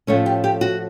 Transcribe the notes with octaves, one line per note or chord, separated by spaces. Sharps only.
A2 F3 A3 C#4 C#5
G4
G4
F#4